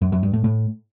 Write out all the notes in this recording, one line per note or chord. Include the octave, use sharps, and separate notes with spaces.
F#2
F#2
G2
A2
A2